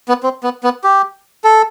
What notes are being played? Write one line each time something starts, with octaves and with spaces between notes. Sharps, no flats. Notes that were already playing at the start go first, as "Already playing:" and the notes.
B3
C4
B3
B3
G4
A4